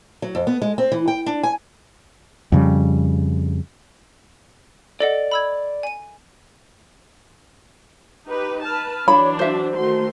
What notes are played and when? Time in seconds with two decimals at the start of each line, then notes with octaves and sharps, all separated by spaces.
0.22 F#3
0.35 F2
0.47 B3
0.62 G#3
0.78 C4
0.92 E3
1.08 G5
1.26 D4
1.43 G#5
2.52 F2 C#3 G3
5.00 A4 D5 D#5 F#5
5.31 B5 E6 G#6
5.83 G#5 D#7
8.26 D#4 G4 B4
8.65 B4 A5 F6
9.08 E3 F#3 D4 C#5 B5
9.39 F#4 C5 E5
9.77 D#3 A3 F#4 C6